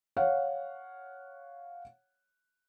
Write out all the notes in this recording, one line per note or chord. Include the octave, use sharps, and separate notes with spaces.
C#5 F5 F#5